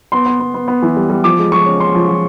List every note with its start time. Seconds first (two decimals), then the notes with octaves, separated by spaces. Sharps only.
0.12 B3 C6
0.26 B3
0.40 B3
0.54 B3
0.68 B3
0.82 E3
0.96 G3
1.10 G3
1.24 F3 D6
1.39 G#3
1.52 F3 C#6
1.66 C#4
1.80 C#4 C6
1.95 F3
2.08 F3